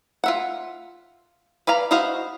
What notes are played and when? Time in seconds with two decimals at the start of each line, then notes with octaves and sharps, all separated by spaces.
0.24 F4 E5 F#5
1.67 B4 D5 F5 A#5
1.91 E4 F#4 C5 D#5 F5